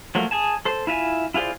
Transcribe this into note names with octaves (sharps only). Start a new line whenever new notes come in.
F3 F#3 A3 A#3
G#4 G#5 A5
A4 C5
E4 F4 E5 G#5
E4 F4 G#4 C5 D5